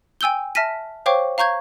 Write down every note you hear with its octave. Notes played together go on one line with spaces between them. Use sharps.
G5 G#5 E6 G6 G7
E5 A5 F6 A#6 B6 D#7
C5 C#5 F5 G5 C#6 D6
F5 A#5 C#6 G6 G#6